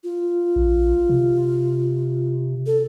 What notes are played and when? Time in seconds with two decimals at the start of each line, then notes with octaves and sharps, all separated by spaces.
0.04 F4
0.56 A#1
1.09 C3
2.66 A4